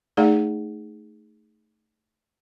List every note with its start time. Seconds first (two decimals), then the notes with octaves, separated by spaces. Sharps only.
0.17 A3 D#4 G#4 D5 F#5